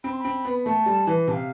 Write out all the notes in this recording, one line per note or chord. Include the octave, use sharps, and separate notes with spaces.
C4 B5
C6
B5
C4
B3
A3 A5
G3
E3
C3 F5 A5